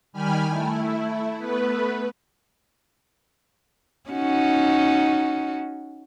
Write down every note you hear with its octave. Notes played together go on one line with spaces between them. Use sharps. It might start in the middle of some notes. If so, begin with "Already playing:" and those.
D#3 G3 G4 G#5 B5 F6
A3 E4
A3 B3 B4
C#4 D#4 F#4